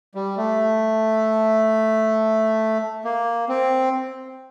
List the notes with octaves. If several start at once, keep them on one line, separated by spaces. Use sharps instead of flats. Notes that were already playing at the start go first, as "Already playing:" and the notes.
G3
A3
A#3
C4